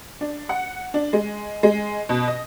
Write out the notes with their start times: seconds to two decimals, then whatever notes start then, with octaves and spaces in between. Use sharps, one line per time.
0.21 D4
0.49 F#5
0.94 D4
1.13 G#3
1.63 G#3
2.09 B2
2.28 D#5